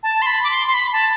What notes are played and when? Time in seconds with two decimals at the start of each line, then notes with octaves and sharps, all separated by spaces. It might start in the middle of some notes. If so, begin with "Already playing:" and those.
0.03 A5
0.22 C6
0.26 B5
0.44 D6
0.50 C6
0.67 C6
0.74 B5
0.93 A5